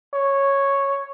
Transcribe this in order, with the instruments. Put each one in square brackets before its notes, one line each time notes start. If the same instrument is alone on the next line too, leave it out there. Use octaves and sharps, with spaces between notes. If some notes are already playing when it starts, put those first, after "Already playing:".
[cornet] C#5